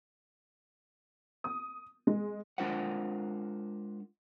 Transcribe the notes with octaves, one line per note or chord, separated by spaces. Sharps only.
D#6
G#3
G#3 D4 F4 A#4 C5 F#5